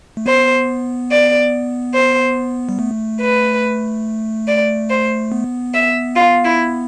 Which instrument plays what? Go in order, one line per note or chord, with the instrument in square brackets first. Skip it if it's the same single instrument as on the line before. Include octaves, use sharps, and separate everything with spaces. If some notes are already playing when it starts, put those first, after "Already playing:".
[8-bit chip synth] A3
[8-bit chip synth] B3 [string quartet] C5
[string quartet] D5
C5
[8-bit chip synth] G3
A3
[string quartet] B4
D5
C5
[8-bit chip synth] B3
[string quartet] E5
F4
E4